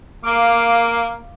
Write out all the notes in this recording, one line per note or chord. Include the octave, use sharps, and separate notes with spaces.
A#3 F5 D6